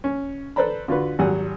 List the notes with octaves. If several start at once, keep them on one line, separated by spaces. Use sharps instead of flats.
C#4
A4 B4 C5 D5 A#5 B5
D3 F4 F#4 B4
G#1 F#3 G3 F#5 G#5